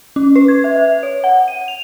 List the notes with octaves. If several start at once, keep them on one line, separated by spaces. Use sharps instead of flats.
C#4
B4
G#6
E5
E5
C#5
F#5
D#7
F7